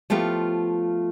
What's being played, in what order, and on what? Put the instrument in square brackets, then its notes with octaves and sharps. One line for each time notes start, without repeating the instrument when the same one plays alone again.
[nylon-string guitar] F3 A3 B3 F4 G4